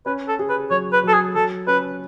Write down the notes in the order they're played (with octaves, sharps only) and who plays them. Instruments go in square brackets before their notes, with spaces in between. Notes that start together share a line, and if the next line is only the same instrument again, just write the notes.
[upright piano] C#4 [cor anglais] B4
[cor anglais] A4
[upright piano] G#4
[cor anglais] B4
[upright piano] F#3 [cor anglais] C#5
[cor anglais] B4
[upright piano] F#3 [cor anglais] A4
[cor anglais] G#4
[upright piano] F#3 [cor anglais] A4
[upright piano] C#4 [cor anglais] B4